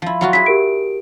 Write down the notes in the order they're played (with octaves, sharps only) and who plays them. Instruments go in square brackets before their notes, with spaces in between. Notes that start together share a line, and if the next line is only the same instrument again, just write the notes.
[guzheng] F3 E4
F#3 F4 F#4
[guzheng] E4 G#4 [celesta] B6
[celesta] G4 A#4 D7